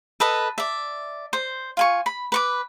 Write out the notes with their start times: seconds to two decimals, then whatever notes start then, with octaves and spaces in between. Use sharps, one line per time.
0.20 A4 B4 D#5
0.58 D5 E5
1.33 C5
1.77 F4 G#5 C#6
2.06 B5
2.32 B4 C#6 D6